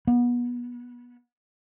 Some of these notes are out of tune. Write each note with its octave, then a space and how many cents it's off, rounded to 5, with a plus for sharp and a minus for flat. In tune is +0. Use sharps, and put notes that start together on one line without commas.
B3 -25